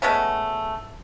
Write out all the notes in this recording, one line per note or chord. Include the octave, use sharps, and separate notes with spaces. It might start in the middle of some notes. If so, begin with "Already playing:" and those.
G#3 A3 B3 C#4